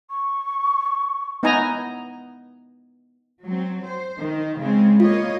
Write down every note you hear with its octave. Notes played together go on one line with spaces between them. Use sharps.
C#6
B3 D#4 E4 D#5 G#5 A#5
F#3 C4
C5
D#3
C#3 G#3 C4
A#3 F4 C#5 D#5